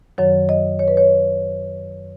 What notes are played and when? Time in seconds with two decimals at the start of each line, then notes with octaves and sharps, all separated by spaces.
0.18 F#2 D#3 F#3 C#5
0.49 D#5
0.79 C#5
0.88 B4
0.97 C#5